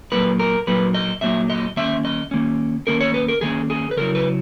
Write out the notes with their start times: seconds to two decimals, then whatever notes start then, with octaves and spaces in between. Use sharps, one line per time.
0.12 A#2 F#3 A#3 D#4 B4
0.39 A#4
0.67 A#2 F#3 A#3 D#4 B4
0.94 D#5
1.21 A#2 F#3 A#3 D#4 E5
1.50 D#5
1.76 D#3 A#3 C#4 E5
2.05 D#5
2.31 D#3 A#3 C#4
2.87 D#3 A#3 C#4 A#4
3.00 C#5
3.14 B4
3.28 A#4
3.41 D#3 A#3 C#4 G#4
3.70 G#4
3.91 B4
3.97 C#3 F#3 C#4 E4 A#4
4.15 B4